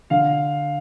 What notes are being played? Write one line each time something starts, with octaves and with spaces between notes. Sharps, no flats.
D3 F5